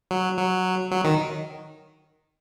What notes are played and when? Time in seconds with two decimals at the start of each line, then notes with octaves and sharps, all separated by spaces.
0.11 F#3
0.38 F#3
0.91 F#3
1.05 D#3